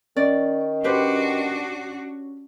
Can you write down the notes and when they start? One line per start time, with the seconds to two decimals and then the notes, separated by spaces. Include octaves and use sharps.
0.16 D#3 C#4 D5
0.84 D4 F#4 G4 B4 C5